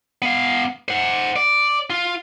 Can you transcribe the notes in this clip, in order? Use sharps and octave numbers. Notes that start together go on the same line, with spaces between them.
B3 F5
C5 F#5
D5
F4